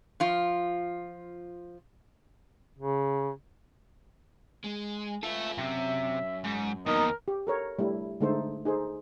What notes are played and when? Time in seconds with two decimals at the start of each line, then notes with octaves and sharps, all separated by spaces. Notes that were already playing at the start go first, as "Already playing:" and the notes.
0.20 F3 F4
2.78 C#3
4.64 G#3
5.23 F4 A4 B4 E5
5.58 F#2 C3 E5
6.44 G#2
6.86 D#2 B2 D#4 A#4
7.28 G4
7.47 A4 A#4 C#5
7.79 G3 A3 E4
8.21 D3 G#3 A3 D#4 A4 C5
8.65 D#4 G#4 A4 C5